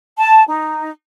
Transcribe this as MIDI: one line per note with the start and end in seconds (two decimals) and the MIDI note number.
0.18 0.44 81
0.49 0.90 63